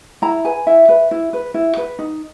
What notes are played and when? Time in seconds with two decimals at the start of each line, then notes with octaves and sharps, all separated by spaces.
0.22 E4 A#5
0.45 B4 G#5
0.66 E4 E5
0.89 B4
1.11 E4
1.33 B4
1.54 E4
1.77 B4
1.99 D#4